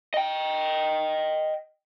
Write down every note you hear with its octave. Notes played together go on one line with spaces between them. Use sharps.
D#5 G5